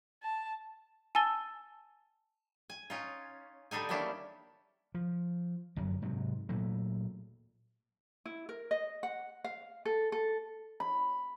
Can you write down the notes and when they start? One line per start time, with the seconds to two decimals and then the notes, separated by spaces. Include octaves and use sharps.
0.23 A5
1.15 G#5 A5 E6 A6 G7
2.70 G#5
2.90 C#4 D#4 F4
3.71 D3 G3 D4 D#4 G#5
3.89 D#3 G3 A#3 C#4 D4 E4
4.94 F3
5.76 G1 F#2 F#3 G3
6.02 G#2 C3 F#3
6.49 A#2 F#3 A3
8.26 E4
8.49 A#4
8.71 D#5
9.03 F#5
9.44 F5
9.85 A4
10.12 A4
10.80 B5